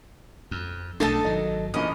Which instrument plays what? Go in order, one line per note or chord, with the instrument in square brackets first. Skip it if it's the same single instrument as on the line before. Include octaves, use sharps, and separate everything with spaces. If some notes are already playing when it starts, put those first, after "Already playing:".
[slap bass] F2
[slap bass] B1 A3 D4 [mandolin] A4 D#5 A5
[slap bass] G#1 F#3 [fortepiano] D#4
[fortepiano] A#1 E2 C#4 [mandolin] D#5